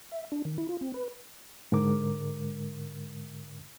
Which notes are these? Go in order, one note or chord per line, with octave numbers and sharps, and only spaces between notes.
E5
D4
D#3
E4
F4
C4
B4
G#2 D3 G#3 A#4 D6